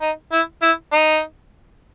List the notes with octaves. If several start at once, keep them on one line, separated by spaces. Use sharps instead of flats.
D#4
E4
E4
D#4